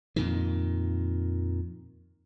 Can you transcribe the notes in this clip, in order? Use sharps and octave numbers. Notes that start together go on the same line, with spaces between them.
F2 A#2 D#3